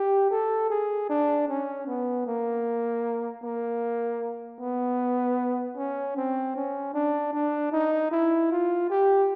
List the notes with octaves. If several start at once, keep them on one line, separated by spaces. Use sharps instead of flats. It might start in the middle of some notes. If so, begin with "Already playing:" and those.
Already playing: G4
A4
G#4
D4
C#4
B3
A#3
A#3
B3
C#4
C4
C#4
D4
D4
D#4
E4
F4
G4